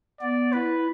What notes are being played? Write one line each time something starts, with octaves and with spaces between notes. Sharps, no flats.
B3 D5
E4 B4